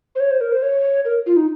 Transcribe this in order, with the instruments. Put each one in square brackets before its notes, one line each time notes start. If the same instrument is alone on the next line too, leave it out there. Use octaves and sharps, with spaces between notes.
[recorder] C5
C#5
C5
A#4
C5
C#5
A#4
F4
D#4